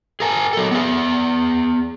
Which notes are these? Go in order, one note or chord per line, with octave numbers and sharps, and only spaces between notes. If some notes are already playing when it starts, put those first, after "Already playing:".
G#4 A#4 G#5 A5
F#3 A4
B3 G#4